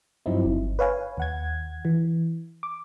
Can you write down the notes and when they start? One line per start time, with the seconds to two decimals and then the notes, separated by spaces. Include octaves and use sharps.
0.26 G2 F3 F#3 C4 D#4 E4
0.45 G1
0.79 B4 C#5 F5 G#5
1.17 D#2 F#5 G#6
1.85 E3
2.63 D6